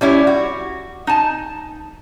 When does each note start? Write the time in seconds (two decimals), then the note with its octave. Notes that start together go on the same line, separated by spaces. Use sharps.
0.01 G3 C#4 E4
0.27 F#4
1.07 D#4 G#5 A5